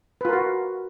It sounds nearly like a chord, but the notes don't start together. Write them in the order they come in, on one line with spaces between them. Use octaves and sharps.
B4 F4 A#4 F#4